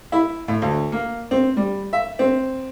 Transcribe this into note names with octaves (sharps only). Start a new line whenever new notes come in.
E4
A2
D2
A#3
C4
G3
E5
C4